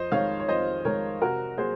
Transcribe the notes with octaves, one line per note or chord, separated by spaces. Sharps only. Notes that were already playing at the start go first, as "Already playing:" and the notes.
Already playing: F2 C5 D#5
D#3 G#3 C#5 F5
C#5
F2 C5 D#5
D#3 G#3 A#4 C#5
C3 F#4 A#4
F#3 A#3 G#4 C5